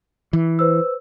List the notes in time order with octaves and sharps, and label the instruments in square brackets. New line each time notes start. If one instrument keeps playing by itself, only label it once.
[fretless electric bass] E3
[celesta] B4 C5 E6